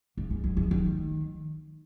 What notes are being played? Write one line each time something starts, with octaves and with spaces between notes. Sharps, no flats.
A#3
G#3
F#3
F3
D#3